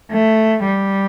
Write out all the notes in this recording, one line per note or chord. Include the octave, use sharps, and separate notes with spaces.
A3
G3